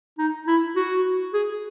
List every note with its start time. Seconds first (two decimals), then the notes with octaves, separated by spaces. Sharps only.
0.18 D#4
0.47 E4
0.76 F#4
1.33 G#4